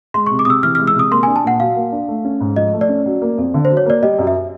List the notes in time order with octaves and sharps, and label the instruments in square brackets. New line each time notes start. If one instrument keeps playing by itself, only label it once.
[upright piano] G#3 [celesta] C6
[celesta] C#6
[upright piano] C3
[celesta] D6
[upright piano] C3 [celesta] D#6 E6
[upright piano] E3 [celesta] F6
[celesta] F6
[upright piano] G#3
[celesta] E6
[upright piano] C3 [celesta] D#6
[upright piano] A#3 [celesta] C6
[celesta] G#5
[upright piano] D4
[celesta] A5
[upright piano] A#2 [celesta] F#5
[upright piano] F#3 [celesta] F5
[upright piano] A#3
D4
A3
C#4
G#2
[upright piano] F3 [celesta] D#5
[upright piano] A3
[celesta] D5
[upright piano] C#4
F#3
A#3
F2
D3
[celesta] C5
[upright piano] F#3
[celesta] C#5
[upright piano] A#3 [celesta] D5
[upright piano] G3 [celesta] D#5
[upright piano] F#2
[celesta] E5